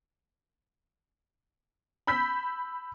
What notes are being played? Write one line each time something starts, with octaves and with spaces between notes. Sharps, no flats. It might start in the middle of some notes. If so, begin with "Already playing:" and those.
B5 E6 G6 B6